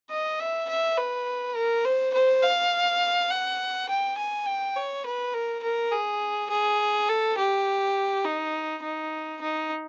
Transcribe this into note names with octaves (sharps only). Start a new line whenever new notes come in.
D#5
E5
E5
B4
A#4
C5
C5
F5
F#5
G5
G#5
G5
C#5
B4
A#4
A#4
G#4
G#4
A4
G4
D#4
D#4
D#4